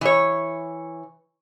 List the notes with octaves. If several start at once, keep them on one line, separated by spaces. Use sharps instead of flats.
E3 C#5